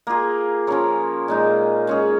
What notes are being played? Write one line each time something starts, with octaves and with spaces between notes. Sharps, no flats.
A#3 F4 G#4
F3 C#4 A#4 C#5
A#2 G#3 D#4
G#3 C#4 G#4